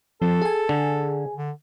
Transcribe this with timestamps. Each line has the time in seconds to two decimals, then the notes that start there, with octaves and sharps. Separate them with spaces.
0.22 F3 C4 A4
0.42 G#4 G#5
0.69 D3
1.36 D3